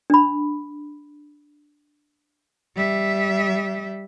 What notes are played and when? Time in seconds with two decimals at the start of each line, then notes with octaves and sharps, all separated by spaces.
0.10 D4 B5
2.76 G3 E5